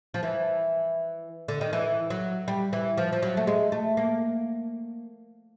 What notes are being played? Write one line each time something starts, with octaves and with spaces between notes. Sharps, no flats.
F3
E3
D3
D#3
E3
F#3
G3
E3
F3
F3
F#3
A3
G#3
A3
A#3